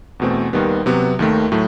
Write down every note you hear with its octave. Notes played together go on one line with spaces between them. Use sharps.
E2 B2 A3 C4
D#2 D#3 G3 B3
C3 F#3 B3 F#4
D#2 D#3 A3
A2 F#3 A3